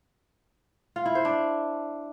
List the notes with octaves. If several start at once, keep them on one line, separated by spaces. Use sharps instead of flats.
F4
E4
C5
D4